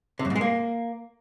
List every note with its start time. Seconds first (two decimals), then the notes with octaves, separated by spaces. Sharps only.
0.19 C3
0.25 F#2
0.30 G#2
0.36 G#3
0.41 A#3